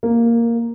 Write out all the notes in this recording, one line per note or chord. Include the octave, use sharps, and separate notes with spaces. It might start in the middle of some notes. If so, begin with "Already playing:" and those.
A#3